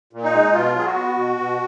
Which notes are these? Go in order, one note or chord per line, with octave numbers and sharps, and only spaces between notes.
A#2
D#4
G#3
B2 F4
F#3 G#4
F#4
B3
B2
B2